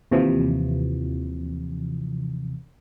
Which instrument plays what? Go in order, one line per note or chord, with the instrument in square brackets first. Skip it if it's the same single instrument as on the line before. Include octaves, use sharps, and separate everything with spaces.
[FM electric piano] D#2 C3 E3 F3